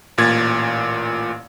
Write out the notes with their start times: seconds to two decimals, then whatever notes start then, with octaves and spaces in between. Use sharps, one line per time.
0.18 A1 A#2 G#6 A6